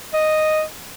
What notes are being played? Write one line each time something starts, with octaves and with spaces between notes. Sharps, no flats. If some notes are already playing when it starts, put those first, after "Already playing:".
D#5